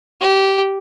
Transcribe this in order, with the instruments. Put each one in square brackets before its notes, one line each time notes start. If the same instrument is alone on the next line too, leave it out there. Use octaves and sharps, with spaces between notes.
[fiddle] G4